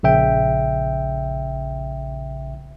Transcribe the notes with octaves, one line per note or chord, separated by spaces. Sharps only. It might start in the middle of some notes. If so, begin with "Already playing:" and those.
A#1 C#3 E5 G5